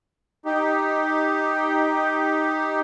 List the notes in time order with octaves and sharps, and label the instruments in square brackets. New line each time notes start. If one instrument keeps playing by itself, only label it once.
[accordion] D#4 G4